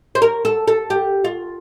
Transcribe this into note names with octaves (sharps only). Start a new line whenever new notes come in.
C5
A#4
A4
A4
G4
F4